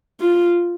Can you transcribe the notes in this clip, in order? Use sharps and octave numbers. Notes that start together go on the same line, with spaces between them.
F4